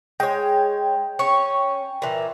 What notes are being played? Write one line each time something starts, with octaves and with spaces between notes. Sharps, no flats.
G#3 C#5 G5
C#4 C#5 C#6
A#2 E3